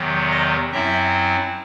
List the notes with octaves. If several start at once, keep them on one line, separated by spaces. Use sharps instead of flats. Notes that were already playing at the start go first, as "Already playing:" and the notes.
Already playing: E2 C3 D#3 F#3
D#5
F#2 F#3 C4 E4 E5